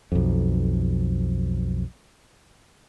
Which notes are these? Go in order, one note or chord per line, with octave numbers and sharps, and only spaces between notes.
B1 F2